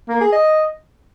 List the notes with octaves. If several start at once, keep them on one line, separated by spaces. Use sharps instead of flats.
A#3
G#4
D#5